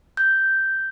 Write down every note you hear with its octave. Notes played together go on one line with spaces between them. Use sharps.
G6